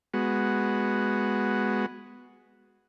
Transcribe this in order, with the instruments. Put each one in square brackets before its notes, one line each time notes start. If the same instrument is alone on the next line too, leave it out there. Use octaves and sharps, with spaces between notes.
[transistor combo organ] G#3 B3 F#4